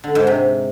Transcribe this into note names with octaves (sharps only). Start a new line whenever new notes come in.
D3
G#2
C3